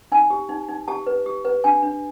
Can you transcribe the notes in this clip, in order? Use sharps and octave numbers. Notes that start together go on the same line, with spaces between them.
D#4 G#5
G4
D#4
D#4
G4 A5
B4
G4
B4
D4 G#5
D4